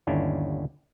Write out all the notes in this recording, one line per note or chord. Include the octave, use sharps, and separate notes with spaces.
G1 D#2 C#4 D4 E4